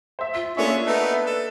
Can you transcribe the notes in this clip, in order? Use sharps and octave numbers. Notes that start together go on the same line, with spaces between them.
C5 E5
F4 B6
A#3 C#4 D4 F4 G#4 C#5 E5
A3 B3 D#4 B4
A4